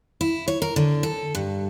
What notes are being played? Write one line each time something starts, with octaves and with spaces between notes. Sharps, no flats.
E4
C#5
A#4
D3
A4
G2